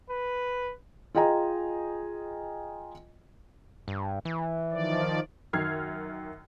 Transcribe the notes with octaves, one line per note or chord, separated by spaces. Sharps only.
B4
F4 G#4 D#5 G5 G#5 A#5
G2
E3
D#3 F3 D5
F#2 D#3 F6 G#6 C7